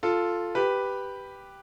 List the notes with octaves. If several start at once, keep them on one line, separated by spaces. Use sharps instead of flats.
F4 A4
G4 B4